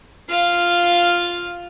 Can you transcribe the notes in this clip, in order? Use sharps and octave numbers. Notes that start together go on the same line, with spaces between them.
F4 F5